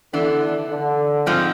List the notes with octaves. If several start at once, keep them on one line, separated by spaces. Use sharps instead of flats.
D3 E3 B3 D4
D3
G#2 F3 G#3 C4